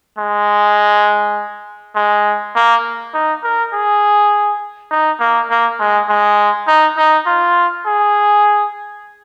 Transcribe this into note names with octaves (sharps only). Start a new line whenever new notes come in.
G#3
G#3
A#3
D#4
A#4
G#4
D#4
A#3
A#3
G#3
G#3
D#4
D#4
F4
G#4